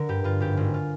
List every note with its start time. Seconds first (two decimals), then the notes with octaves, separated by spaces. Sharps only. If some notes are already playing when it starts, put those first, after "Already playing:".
Already playing: D3 A#4
0.09 G2 G4
0.24 G2 F4
0.40 G#1 G4
0.57 G#1
0.74 F4